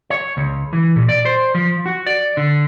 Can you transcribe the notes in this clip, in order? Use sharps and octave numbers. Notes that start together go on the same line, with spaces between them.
C#5
C#2
E3
A#2
D5
C5
F3
F#4
D5
D3